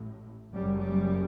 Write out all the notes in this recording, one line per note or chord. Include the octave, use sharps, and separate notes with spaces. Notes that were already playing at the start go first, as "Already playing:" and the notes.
Already playing: A1 A2
F#1 F#2 C#3 G3
G3